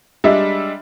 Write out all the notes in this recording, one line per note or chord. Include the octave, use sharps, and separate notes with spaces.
G3 G#3 D4 E5